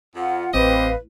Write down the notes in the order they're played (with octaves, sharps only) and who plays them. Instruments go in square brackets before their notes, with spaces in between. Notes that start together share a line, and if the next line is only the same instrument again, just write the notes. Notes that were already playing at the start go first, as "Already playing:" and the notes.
[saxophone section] F2 [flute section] F4 F#5
[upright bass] A1 [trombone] C4 [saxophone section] G4 D5 D#5 [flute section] B4 F5